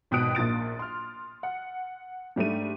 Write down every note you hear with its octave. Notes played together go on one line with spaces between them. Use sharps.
G#1 B2 G5 D#6 F#6 D7
A#1 A#2 A6 D7
C6 F6
F#5
G#2 G3 A3 D4 D#7